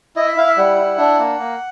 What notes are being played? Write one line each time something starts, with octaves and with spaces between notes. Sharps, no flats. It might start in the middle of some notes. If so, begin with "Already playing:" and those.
E4 D#5
E5
E4 F5
E5
G3 F#5
E4
D4
A#3
A#3